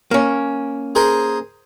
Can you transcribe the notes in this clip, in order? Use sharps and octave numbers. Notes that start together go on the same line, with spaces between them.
A#3 C#4
G#4 A#4 C5